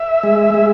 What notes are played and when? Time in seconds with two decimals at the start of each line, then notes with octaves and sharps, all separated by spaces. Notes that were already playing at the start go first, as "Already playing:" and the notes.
Already playing: E5
0.23 G#3
0.54 G#3